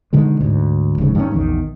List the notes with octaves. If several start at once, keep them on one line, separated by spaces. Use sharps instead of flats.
B2 D3 D#3 G#3
D2 G#2
F1 D2 G#2 C#3
G2 D#3 F#3 C#4
A#1 E2 D#3